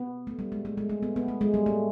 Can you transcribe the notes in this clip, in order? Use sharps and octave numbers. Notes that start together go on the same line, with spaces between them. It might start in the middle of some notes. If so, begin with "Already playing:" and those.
Already playing: B3
A3
G3
G#3
A3
G#3
A3
B3
B3
A3
G#3
G3
A3